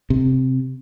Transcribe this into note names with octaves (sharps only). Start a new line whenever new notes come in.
C3